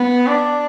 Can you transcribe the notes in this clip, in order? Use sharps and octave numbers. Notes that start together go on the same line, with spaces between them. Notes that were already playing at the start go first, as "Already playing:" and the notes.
Already playing: B3
D4